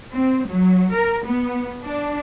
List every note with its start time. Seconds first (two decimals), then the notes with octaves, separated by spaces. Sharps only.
0.14 C4
0.47 F#3
0.93 A#4
1.26 B3
1.84 D4